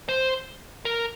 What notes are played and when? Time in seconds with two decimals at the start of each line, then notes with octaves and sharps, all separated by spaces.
0.09 C5
0.85 A#4